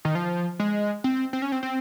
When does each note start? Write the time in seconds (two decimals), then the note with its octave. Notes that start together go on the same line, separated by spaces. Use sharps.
0.05 D#3
0.15 F3
0.59 G#3
1.04 C4
1.33 C4
1.42 C#4
1.52 C4
1.63 C4